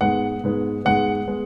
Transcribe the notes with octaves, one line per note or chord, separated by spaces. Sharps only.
G#2 G#3 B3 F#5
G#2 G#3 B3
G#2 G#3 B3 F#5
G#3 B3